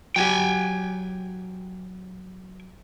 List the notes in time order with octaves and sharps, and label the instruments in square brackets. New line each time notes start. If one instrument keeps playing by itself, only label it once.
[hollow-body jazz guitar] F#3 G4 [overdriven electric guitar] G5 G#5